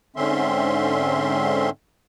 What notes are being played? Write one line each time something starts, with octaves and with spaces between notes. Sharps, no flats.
G#2 D3 C4 C#4 E5 C6